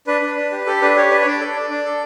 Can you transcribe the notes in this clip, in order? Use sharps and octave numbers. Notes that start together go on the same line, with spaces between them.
D4 B4
D4
D4
G4
G4 A4
D4 B4
G4 C#5
D4 B4
C#5
D4 D5
A4
D4
D4
A4